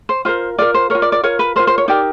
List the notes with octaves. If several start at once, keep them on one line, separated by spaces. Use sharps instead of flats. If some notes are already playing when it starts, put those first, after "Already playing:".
C5
F4 A#4 C5
F4 A#4 D5
C5
F4 A#4 C#5
D5
D5
F4 A#4 C#5
B4
F4 A#4 C5
C5
C#5
D#4 G4 A#4 D5